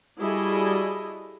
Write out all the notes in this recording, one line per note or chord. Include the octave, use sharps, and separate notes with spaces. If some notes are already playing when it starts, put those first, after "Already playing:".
G3 E4 F#4 G#4 A4 D#5